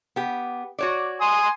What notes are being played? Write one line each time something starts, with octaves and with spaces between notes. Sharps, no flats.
B3 G4
F#4 C#5 D5
G#5 C6 D#6